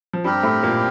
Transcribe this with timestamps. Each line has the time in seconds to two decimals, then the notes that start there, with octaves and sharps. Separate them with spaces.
0.13 F3
0.24 G2 G3 C4 G4 A#4
0.43 A2 A3
0.63 A#2 A#3